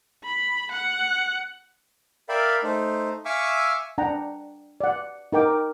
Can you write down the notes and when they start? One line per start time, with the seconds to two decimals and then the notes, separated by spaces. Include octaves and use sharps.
0.24 B5
0.72 F#5
2.29 A#4 D5 E5 F5 G5 B5
2.63 A3 D#4 C5
3.25 E5 F5 G#5 C#6 D6 E6
3.98 D4 F#5 G5 A#5
4.80 D5 F#5
5.32 D#4 A#4 G5 D6